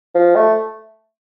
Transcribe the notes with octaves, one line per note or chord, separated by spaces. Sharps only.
F3
A3